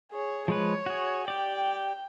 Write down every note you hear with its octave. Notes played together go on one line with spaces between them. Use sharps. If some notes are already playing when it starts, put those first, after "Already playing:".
G#4 C#5
F3 G#3 B4 C#5
F#4 G#4
G4 D5 G5